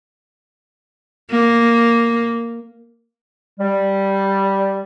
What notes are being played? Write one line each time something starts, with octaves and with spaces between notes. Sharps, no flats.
A#3
G3